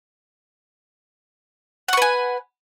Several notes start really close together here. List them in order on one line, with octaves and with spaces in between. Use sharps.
F#5 C#6 B4 G#5